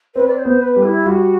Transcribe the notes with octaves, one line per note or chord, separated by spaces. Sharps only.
C4 B4
D5
C5
B3
B4
G3
E4
G3 F#4